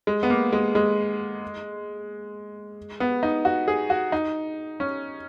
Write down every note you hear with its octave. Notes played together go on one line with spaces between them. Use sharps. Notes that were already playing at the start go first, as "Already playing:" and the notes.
G#3
B3
A#3
G#3
G#3
B3
D#4
F#4
G#4
F#4
D#4
C#4